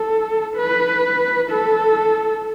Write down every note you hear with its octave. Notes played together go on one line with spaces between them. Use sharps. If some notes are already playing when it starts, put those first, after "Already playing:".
Already playing: A4
B4
A4